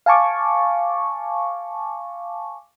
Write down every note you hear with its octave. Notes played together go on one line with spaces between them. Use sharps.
F5 G#5 A5 C#6 D6